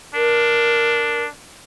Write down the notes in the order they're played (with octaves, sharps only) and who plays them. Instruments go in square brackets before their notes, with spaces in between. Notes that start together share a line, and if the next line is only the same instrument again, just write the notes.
[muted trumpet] D4 [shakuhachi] A#4